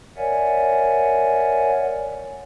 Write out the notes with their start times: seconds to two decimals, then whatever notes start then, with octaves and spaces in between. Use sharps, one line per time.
0.17 A#4 C#5 D5 E5 F#5 G#5